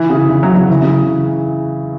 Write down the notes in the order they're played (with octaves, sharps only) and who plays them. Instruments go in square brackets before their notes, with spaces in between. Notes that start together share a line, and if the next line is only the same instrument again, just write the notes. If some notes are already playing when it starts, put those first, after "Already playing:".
Already playing: [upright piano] E3
C#3
E3
F#3
F#3
E3
C#3